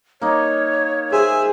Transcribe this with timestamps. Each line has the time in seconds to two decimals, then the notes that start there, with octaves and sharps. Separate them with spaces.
0.21 A#3 D#4 C#5
1.12 G#4 C5 E5 G#5